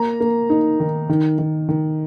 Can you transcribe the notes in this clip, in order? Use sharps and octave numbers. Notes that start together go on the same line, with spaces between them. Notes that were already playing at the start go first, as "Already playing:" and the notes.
Already playing: A#3 A#5
A#3
D#4
D#3
D#3
D#3
D#3